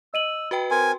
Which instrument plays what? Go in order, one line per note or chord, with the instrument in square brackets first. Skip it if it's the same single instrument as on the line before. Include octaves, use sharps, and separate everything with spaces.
[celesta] D#5 D#7 F#7 [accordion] E6
[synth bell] F#4 B4 G5
[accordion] C4 A#4 [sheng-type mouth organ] G#5 [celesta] C6